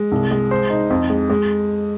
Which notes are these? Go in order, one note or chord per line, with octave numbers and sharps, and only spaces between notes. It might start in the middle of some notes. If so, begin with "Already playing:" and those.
Already playing: G#3
C2
G#3
C5
D#4
F2
G#3
G#3